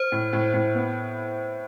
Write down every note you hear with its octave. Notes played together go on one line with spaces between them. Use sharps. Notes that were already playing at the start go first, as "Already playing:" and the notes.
Already playing: C5
A2
A2
A2
B3